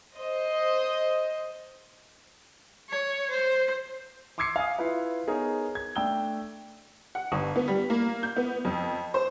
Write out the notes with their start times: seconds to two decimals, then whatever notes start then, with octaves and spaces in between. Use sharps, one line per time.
0.17 C5 D#5
2.89 C#5
3.30 C5
4.38 C6 D6 E6 G#6 C7 C#7
4.56 F5 G#5 D#6
4.79 E4 F4 B4 F5
5.27 B3 D#4 G#4 A#4 C#5
5.75 G#6
5.96 A3 D4 G5 E6 G7
7.15 F#5
7.32 G1
7.56 B3
7.68 G3
7.90 A#3
8.23 G6
8.36 B3
8.65 F2
9.14 C5